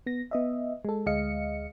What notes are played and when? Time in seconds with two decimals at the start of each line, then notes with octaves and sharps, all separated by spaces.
0.06 B3 A#6
0.31 B3 D#5 E5
0.85 G#3 A4
1.06 D2 G#3 D#5 F5 C#7